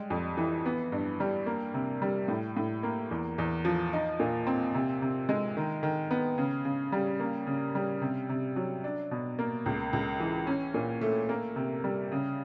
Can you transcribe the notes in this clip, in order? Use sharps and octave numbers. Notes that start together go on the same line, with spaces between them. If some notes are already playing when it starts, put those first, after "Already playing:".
Already playing: G3 G#3
F2
E3
B3
G2
G3
A#3
C3
G3
A2
A2
A#3
E2
E2
F3
D#4
A#2
C4
C3
C3
G#3
D#3
D#3
B3
C#3
C#3
G3
A#3
C#3
G3
C3
C3
F#3
D4
B2
A#3
C#2
C#2
E3
C#4
A#2
A3
A#3
C3
G3
C#3